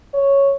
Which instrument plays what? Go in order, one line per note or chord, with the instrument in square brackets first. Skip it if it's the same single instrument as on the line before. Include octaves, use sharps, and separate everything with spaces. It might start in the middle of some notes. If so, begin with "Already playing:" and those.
[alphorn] C#5